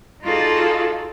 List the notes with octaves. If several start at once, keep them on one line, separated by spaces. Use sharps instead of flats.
D#4 F4 F#4 G#4 A4 D5